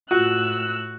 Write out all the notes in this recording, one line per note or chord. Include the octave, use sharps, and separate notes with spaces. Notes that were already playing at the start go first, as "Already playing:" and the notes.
A2 F4 F#4 E6 F#6